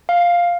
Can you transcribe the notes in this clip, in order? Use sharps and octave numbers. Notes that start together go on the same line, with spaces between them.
F5